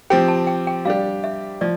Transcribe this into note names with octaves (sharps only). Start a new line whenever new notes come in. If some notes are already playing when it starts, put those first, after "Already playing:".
F3 C4 G4 G5
A5
G5
G5
G3 D4 G4 F5
E5
F3 D5